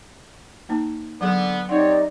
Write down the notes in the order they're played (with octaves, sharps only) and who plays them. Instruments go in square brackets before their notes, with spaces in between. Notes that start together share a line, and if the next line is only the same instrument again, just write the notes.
[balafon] A#3 D#4 A5
[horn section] D3 B3 [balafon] F#3 G#4
[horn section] C4 G4 C#5 [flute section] D#4 D5 [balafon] F#5